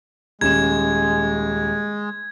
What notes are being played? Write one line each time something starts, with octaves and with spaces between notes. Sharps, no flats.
D#1 G#3 C#4 G#6 E7